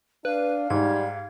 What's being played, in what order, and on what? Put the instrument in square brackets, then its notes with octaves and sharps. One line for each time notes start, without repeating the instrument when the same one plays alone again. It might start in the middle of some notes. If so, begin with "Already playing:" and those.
[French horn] D4 [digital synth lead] B4 [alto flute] F5
[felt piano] G#2 [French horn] G3 [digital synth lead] G#6